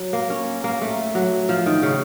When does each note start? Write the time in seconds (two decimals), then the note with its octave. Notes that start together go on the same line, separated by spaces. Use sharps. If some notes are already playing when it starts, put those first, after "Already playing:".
Already playing: F#3
0.13 A#3
0.30 C#4
0.64 A#3
0.81 A3
1.15 F#3
1.49 F3
1.66 D#3
1.83 C#3